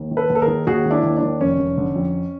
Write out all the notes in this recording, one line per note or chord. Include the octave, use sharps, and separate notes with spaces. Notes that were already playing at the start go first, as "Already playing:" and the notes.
Already playing: D#2
D#3
A4 B4
D#2
A4
G#4 A#4
D#3
D#2 F#4 G#4
D#3
D4 E4
D#2
D4
D#3
F1 C#4
F1
D3
F2